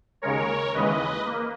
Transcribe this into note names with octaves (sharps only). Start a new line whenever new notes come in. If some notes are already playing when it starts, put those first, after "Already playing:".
D#2 C#3 G#3 A#4 C#5
D#2 C#3 E3 G#3 B4 D#5
A#3